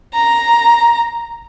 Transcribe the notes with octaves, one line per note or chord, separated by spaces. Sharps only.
A#5